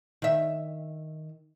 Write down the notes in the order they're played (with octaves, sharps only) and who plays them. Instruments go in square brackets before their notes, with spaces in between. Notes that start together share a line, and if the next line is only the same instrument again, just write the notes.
[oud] D#3 E5